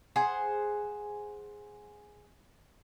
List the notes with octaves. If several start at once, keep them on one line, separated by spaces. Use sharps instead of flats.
G#4 C5 F#5